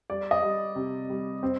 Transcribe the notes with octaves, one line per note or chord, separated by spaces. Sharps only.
G3 D5
D#5
G3
C3
G3
C4